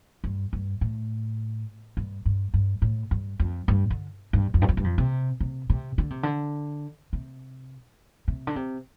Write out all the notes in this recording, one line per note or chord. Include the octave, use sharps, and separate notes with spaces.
G2
G2
A2
G2
G2
G2
A2
G2
F2
G2
D3
G2
F2
G2
F2
G2
F2
C3
C3
C3
D3
C3
D3
C3
C3
D3
C3